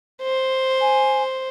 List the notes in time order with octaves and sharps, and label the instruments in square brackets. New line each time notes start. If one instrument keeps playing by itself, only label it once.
[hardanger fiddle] C5
[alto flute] G#5